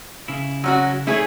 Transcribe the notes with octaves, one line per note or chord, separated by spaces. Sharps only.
C#3 E4
F#3 C#4 F#4
A3 D#4 E4 G#4 B4 C#5